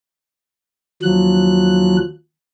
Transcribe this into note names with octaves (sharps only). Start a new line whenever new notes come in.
D#2 F3 F#3 F#6